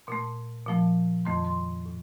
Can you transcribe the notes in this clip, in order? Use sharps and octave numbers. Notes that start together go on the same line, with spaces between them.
A#2 A3 C6
A#2 F3 A3
F2 D#3 A3 C6
C6
A2